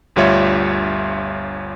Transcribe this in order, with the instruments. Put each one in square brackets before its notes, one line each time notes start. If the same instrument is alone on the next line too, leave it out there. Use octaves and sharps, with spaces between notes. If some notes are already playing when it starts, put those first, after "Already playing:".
[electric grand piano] G1 D2 G3 F4 C#5 E5